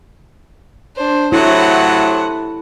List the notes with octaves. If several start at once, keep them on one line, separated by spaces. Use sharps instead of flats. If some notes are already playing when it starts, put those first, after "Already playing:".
D4 C5
A2 C3 F#3 A3 E4 F#5